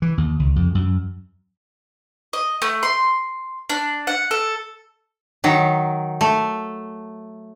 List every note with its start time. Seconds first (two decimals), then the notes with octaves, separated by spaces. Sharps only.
0.02 E3
0.18 D#2
0.39 C#2
0.56 F2
0.75 F#2
2.33 D#5
2.62 A3
2.83 C6
3.70 D4
4.07 F#5
4.31 A4
5.44 D#3 F#3
6.21 A3